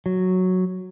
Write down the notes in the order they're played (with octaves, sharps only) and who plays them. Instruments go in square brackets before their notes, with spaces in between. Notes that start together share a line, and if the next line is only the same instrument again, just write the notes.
[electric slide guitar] F#3